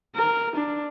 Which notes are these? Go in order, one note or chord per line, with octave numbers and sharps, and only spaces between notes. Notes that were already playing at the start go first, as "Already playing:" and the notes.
A#4
D4